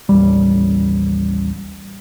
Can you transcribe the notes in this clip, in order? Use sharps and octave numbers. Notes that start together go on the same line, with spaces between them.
A1 D#2 G3